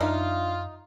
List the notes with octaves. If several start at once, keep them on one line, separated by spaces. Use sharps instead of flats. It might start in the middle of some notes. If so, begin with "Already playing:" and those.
F#2 D4 D#4 F4 E5 F5